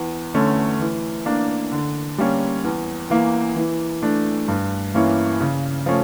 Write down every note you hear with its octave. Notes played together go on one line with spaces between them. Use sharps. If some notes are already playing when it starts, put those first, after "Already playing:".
Already playing: E2
D3 A3 C#4
E3
A#3 D4
D3
G3 A#3 C#4
E2
E3 A#3
E3
A3 D4
G2
E3 A#3 C#4 E4
C#3
F3 A3 C#4